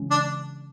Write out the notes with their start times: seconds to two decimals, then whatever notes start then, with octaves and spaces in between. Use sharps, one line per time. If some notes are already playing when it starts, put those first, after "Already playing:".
Already playing: C#3 E3 G#3 C#4
0.11 D4